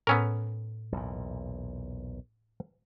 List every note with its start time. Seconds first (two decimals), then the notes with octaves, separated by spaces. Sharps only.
0.07 A2 B3 C#4 A#4 E6
0.92 B1 E2 A#2